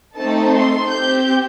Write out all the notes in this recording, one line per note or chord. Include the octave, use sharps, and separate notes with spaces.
A3 C4 D#4 A4 A5
C6
C4 G4 G6